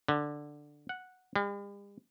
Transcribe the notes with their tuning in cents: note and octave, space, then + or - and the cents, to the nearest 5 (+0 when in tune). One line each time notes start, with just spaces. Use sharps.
D3 +5
F#5 -5
G3 +45